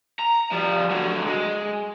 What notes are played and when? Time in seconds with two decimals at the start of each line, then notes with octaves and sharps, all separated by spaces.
0.19 A#5
0.51 F3 G3
0.90 D3 F#3
1.26 G#3